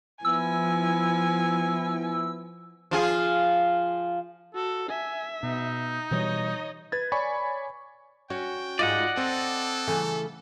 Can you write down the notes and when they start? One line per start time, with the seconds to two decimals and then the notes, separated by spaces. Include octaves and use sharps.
0.25 F3 B3 E4 G#5 E6
2.91 F3 F4 G#4
4.55 F#4 A4
4.89 E5 G#5
5.43 B2 D#4
6.11 B2 E3 G3 C#5 D#5
6.92 B4 G#6 A6
7.12 C#5 D5 G#5 B5 C#6
8.30 C#4 F#4 G5
8.79 G#2 D#4 F4 D5 D#5 F#5
9.17 C4 A4 C5
9.87 C#3 E3 A3